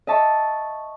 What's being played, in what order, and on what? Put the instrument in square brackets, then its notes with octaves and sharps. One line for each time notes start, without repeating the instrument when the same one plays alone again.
[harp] D#5 E5 A5 C#6